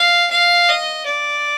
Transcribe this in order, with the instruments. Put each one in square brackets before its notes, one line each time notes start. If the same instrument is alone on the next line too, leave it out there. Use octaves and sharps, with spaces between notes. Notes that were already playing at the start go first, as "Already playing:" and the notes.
Already playing: [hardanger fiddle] F5
F5
D#5
D5